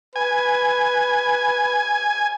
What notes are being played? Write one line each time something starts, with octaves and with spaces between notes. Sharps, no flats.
B4 G#5